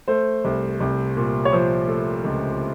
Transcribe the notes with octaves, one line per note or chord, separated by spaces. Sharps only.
A3 C5
C2
C2
A#2
C#5
F3 C5
A3
C#2